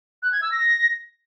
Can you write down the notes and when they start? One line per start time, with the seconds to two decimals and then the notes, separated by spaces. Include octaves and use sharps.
0.23 F#6
0.32 G#6
0.42 E6
0.52 A#6